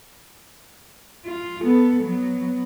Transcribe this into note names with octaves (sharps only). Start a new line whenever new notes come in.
F4
B3 A4
F#3 B3